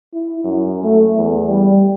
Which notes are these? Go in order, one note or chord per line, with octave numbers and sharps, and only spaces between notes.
E4
F#2
A3
E2
G3